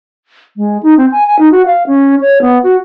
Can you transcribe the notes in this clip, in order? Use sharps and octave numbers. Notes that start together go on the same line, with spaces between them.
G#3
D#4
C4
G#5
G#5
D#4
F#4
F5
C#4
C#5
B3
F#4